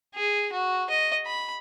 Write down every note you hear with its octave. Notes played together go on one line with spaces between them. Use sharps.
G#4
F#4
D#5
B5